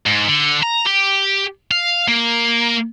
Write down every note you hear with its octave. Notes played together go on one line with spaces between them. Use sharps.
G#2
D3
A#5
G4
F5
A#3